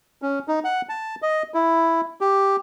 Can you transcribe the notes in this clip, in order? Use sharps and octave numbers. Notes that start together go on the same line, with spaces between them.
C#4
D#4
F#5
A5
D#5
E4
G4